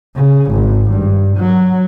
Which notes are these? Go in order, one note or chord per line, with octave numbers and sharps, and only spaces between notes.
C#3
G#1
G2
F#3